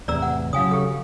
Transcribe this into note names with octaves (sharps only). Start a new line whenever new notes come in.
E2 A2 C3 D5 A#5 E6
F#5
C#3 F#3 F5 G#5 D#6
G4 A4